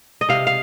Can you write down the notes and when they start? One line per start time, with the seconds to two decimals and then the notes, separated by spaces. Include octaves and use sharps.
0.21 D#5
0.29 C3 F5
0.47 F5